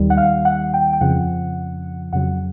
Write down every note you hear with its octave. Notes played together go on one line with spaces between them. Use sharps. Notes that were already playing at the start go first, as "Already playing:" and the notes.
Already playing: D#2 D#3 G3
F#5
F5
F#5
G5
G5
F2 C#3 F3 F#5
F2 C#3 F#3 F#5